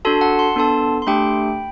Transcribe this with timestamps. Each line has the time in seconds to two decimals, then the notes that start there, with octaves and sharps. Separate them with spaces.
0.05 D4 F#4 A4 A5 C6
0.21 F#5 A5
0.39 C6
0.56 B3 D4 A4 A5 C6
1.02 C6
1.07 A3 D4 G4 G5 B5